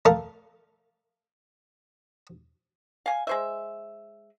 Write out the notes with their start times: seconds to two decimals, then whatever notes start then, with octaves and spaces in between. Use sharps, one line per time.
0.05 A3 A#4 F5
3.06 F5 G#5
3.27 G#3 C5 E5